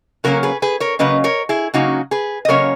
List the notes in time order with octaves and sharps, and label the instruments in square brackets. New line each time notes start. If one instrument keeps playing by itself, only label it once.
[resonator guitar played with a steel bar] C#3 F#3 A#3 C#4 F#4 A#4
G#4 B4
G#4 B4
A#4 C#5
C#3 F#3 A#3 C#4 B4 D#5
A#4 C#5
E4 G#4
C#3 F#3 A#3 C#4 D#4 F#4
G#4 B4
D#5
C#3 F#3 A#3 C#4 A#4 C#5